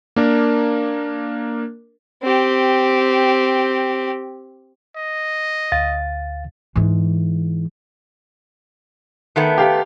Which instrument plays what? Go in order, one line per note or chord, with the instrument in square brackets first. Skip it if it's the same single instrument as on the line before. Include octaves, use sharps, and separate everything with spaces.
[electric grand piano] A#3 D4 A#4
[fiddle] C4 G4
[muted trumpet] D#5
[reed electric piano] D2 F5 A6
[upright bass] G#2 E3
[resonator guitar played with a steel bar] D#3 A3 B3
[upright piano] G4 F5 G5